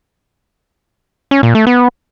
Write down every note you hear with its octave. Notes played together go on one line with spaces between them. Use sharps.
C#4
A#2
A3
B3